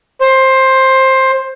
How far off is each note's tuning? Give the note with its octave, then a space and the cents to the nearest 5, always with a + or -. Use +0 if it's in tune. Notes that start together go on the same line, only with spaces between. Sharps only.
C5 +15